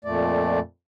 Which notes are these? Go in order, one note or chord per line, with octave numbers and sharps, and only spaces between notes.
F2 A#2 A3 D5